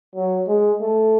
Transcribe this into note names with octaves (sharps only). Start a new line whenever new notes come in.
F#3
G#3
A3